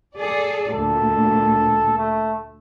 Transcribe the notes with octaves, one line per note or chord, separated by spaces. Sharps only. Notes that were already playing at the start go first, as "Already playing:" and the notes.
G#4 A4 D5
D2 A#2 A4
A3